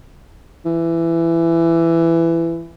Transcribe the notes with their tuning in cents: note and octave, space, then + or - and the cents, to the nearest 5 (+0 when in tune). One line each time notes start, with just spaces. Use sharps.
E3 +15